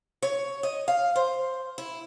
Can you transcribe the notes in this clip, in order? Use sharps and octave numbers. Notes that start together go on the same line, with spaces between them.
C#5
D#5
F5
C5
E4